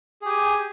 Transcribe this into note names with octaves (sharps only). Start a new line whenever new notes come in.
G4 G#4 G#5